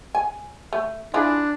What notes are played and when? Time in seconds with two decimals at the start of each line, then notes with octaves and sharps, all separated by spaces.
0.15 G#5
0.73 A3
1.14 D4 E4 F4 G#4